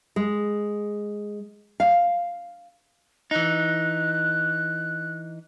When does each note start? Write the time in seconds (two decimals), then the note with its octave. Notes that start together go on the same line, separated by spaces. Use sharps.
0.16 G#3
1.80 F5
3.31 E3 D#4 F#6